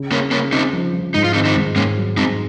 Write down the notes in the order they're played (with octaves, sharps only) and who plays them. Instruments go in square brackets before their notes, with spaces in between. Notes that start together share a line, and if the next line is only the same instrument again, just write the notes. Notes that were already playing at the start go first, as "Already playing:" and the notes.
Already playing: [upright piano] C#3
[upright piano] C#3 [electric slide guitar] A#3 C#4
[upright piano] C#3 [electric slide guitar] A#3 C#4
[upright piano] C#3 [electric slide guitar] C4 D#4
[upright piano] F3
F3
[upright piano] G#2 [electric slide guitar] D#4
[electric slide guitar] F4
[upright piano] D#3 [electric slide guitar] C4 D#4
[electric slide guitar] C4 D#4
[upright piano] G#2
[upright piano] G#2 [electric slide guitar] A#3 C#4
[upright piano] F#3
[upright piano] G#2 [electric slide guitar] C4 D#4